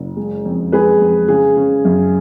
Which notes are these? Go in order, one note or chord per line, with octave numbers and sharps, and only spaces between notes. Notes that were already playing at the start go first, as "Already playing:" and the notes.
Already playing: F#1
G#3
F2
G#3 G#4 B4
F2
C#3 G#4
C#3
F#2